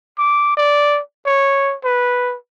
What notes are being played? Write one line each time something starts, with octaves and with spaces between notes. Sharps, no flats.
D6
D5
C#5
B4